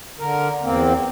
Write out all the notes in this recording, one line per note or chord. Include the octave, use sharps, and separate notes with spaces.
D3 A#4
E2 A#3 C4